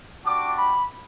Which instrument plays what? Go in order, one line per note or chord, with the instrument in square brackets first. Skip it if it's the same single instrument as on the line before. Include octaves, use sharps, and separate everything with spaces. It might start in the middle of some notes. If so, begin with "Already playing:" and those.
[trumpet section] G3 D4 F#4 D6
B5